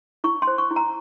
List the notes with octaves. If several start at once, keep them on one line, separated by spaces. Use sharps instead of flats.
E4 C#6
C6
C5
C#6
E4
A#5